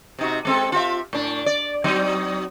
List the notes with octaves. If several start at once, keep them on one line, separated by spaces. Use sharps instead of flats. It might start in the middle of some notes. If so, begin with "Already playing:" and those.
C3 D#4 F#4
G#3 C4 A4
F4 G4 E5
A2 D4
D5
F#3 C4 D#4